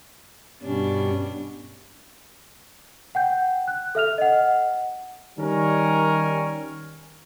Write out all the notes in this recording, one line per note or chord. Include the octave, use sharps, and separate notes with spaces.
G2 B2 G3 C#4 D4
F#5 G5 G6
F#6
A4 E5 F6 F7
D#5 F#5
D#3 G3 C#4 A#4